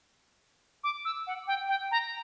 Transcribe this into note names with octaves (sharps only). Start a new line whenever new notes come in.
D6
E6
F#5
G5
G5
A#5